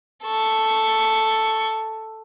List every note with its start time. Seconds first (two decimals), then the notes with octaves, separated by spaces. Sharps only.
0.25 A4 C#6